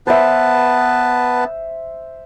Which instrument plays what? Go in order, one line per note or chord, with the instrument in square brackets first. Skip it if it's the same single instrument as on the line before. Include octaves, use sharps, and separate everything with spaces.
[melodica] B3 B4 A5 [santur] C5 E5